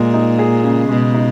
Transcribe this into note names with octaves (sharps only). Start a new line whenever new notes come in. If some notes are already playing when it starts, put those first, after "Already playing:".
Already playing: A#2 G#3
D#4
G#4
C#3
B2 G#3
D#4